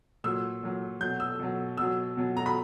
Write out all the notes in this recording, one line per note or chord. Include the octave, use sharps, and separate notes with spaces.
A#2 F#3 E6
A#2 F#3
B2 F#3 G6
E6
B2 F#3
B2 F#3 E6
B2 F#3
A#5
B5